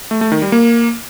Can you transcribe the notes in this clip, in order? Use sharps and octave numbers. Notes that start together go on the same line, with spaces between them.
A3
A3
D#3
G3
A#3